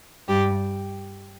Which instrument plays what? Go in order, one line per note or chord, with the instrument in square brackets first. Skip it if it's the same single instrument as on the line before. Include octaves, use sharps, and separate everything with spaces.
[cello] G2 [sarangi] G4